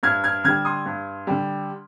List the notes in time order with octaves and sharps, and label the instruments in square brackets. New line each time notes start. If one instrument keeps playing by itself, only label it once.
[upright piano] G2 F6 G#6
F6 G#6
D3 G3 F6 G#6
C6 D#6
G2
D3 G3